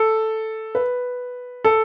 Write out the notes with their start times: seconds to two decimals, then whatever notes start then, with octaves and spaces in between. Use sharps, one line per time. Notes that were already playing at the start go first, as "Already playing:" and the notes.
Already playing: A4
0.75 B4
1.65 A4